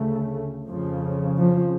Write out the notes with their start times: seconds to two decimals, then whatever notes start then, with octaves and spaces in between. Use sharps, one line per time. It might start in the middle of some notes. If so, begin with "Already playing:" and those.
Already playing: D2 C#3 A3
0.68 F2 C#3 F3
1.37 F3